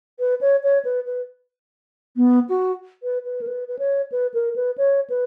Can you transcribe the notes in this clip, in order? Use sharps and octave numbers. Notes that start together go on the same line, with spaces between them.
B4
C#5
C#5
B4
B4
B3
F#4
B4
B4
A#4
B4
B4
C#5
B4
A#4
B4
C#5
B4